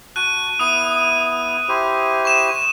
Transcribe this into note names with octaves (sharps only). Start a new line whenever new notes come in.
F#4 A5 F#6 D#7
B3 E4 D#6 D#7
E4 G4 C5
C#6 E7